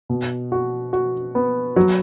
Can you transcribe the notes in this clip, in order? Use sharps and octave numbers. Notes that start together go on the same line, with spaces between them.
B2
F#4
F#4
B3
F#3